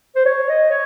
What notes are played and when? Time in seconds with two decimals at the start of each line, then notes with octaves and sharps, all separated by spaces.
0.15 C5
0.25 C#5
0.49 D#5
0.70 C#5